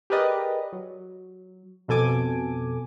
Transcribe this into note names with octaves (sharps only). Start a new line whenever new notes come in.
G4 G#4 A#4 B4 D5 D#5
F#3
F2 B2 A4 G#5 D6